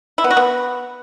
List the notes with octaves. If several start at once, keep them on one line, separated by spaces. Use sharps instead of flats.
E4
B3
F#4
B3